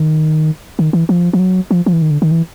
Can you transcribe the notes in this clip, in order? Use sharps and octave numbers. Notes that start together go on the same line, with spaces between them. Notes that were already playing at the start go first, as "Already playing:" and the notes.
Already playing: D#3
D#3
E3
F3
F3
F#3
F3
F3
E3
D#3
D3
D#3
E3